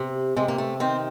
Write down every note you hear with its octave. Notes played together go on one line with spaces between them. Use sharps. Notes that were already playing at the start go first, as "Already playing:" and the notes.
Already playing: C3
C3 G#3
A#3
A3
D#3 C4